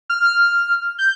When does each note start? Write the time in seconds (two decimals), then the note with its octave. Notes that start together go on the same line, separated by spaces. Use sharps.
0.10 F6
0.98 G6